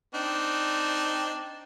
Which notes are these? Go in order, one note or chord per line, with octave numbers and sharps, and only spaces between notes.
C4 D4 D#4